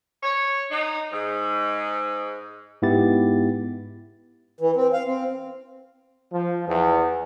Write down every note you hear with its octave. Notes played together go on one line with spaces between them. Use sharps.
C#5
D#4
G#2
G#2 B3 E4 G4 A6
E3
C4
F5
C4
F3
E2